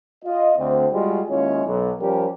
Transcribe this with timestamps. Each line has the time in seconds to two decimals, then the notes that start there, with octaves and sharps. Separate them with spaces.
0.24 F4 D#5
0.58 D2 C4
0.92 G3 G#3 F4 F#4 G#4
1.29 D#2 G#3 C#4 E4 F4 C#5
1.65 B1
1.99 F3 G3 C#4 G4 A#4